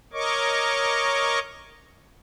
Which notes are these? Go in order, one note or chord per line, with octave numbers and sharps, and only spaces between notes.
A#4 C#5 D#5 C#6 D6